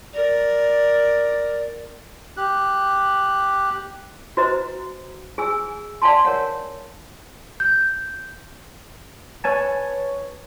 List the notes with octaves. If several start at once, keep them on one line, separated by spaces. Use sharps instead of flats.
A#4 D5
G4 F#6
F#4 B4 C5 D#5 A#5
G#4 G#5 E6
D5 F5 G#5 A5 C6
A#4 C#5 F#5
G6
B4 C#5 G#5 A5